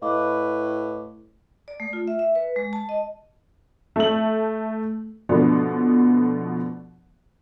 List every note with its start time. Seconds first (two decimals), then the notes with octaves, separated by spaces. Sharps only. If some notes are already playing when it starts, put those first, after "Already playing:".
0.02 A2 B4 D#5 F5 D6
1.68 D5
1.80 A3
1.93 F4
2.08 E5
2.19 E5
2.35 B4
2.56 G#3
2.73 A5
2.89 D#5
3.96 A3 F#7
5.29 B2 D3 F3 A3 B3 D4